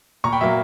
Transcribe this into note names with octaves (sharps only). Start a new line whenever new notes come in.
A#2 A#5 C#6
G5 B5
F#3 A#3 E5